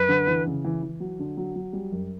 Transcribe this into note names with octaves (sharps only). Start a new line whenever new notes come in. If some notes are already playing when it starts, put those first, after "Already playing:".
Already playing: F#2 B4
D3
E3
C#3
E3
E3
F#3
D3
F#3
F#3
G3
F#2